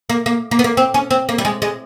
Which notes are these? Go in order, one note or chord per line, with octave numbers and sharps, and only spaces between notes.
A#3
A#3
A#3
B3
A#3
C4
C#4
C4
A#3
G3
G#3
G#3